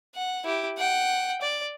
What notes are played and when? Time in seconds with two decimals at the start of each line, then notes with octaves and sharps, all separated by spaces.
0.15 F#5
0.45 E4 G4
0.78 F#5 G5
1.42 D5